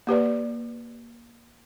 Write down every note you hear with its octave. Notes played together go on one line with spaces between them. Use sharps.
A#3 G4 B4 D5